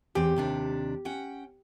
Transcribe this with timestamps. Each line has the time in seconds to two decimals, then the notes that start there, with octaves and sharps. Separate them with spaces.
0.15 E2 C4 G4
0.36 D#2 C3 D4
1.05 C#4 F#5 G5